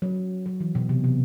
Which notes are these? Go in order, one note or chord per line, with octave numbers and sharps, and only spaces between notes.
F#3
F#3
E3
B2
C3
C3